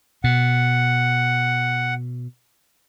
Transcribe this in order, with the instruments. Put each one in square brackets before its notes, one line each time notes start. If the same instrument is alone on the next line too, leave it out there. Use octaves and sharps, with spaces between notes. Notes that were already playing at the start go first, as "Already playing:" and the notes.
[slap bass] B2 [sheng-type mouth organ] F#5